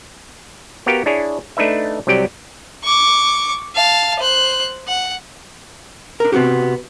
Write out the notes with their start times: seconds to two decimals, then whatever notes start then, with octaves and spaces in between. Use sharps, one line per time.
0.86 B3 F#4 G4 A#4 F5 G5
1.06 D4 E4 G#4 C#5
1.57 A3 D4 D#4 B4 E5
2.07 C2 C3 F#3 G4 D5 G5
2.84 C#6 D6
3.75 F5 A5
4.20 C5 F#6
4.88 F#5
6.20 D4 A#4
6.32 C3 B3 C4 F#4 G4